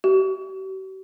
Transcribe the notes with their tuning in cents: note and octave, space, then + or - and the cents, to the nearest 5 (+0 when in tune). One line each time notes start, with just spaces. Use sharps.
G4 -45